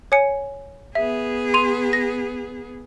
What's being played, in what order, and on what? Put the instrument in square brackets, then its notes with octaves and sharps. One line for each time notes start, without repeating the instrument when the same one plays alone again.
[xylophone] C#5 G#5 C#7
[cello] B3 G#4 [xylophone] E5
[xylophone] C6 D#7 F7
A#6